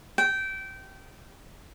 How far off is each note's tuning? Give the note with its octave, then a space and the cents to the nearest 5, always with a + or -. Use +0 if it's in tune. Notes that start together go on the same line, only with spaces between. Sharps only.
G5 -20